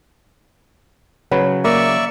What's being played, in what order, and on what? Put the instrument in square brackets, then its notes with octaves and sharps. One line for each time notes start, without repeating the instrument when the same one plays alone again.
[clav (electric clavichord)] C#3 F#3 [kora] B4
[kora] A#3 [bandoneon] D5 E5 C#6